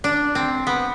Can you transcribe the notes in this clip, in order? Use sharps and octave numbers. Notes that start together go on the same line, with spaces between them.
D4
C4
B3